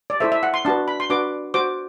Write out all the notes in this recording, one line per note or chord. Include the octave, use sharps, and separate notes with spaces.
D5
E4 A4 C5 E5
E5
F#5
C6
D4 F#4 B4 A5
B5
C6
D4 F#4 B4 D6
F#4 C5 D6